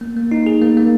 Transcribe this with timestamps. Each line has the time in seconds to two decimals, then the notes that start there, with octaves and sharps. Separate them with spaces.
0.01 A#3
0.17 A#3
0.32 D#4
0.47 G#4
0.62 A#3
0.77 A#3